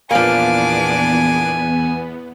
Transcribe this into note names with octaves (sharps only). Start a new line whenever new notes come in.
E2 A#2 F3 A#3 B3 D4 G#5 D6